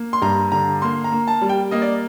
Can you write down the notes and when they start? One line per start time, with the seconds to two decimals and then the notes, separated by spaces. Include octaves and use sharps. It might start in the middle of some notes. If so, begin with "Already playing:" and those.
Already playing: A#3
0.13 C6
0.22 G2 A#5
0.52 D3 A#5
0.82 A#3 C6
1.04 A#5
1.12 A#3
1.28 A5
1.42 G3
1.49 G5
1.71 A#3 D#5
1.82 D5